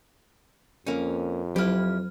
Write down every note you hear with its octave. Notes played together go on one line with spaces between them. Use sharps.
F2 A#3 C#4
F#3 E4 G4 F6